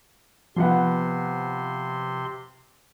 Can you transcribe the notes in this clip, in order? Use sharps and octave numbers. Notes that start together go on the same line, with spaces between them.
C3 F3 B3 F#5 C6